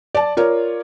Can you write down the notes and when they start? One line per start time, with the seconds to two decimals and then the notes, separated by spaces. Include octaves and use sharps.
0.15 D5 A5
0.37 F4 A#4 C#5 D5